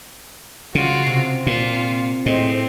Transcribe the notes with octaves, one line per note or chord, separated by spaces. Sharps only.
C#3 G3 F4 F#4
C3
A#2 F4
A2 G#3 C4